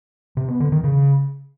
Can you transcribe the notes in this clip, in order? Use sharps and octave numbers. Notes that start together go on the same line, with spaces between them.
C3
B3
D3
D#3
C#3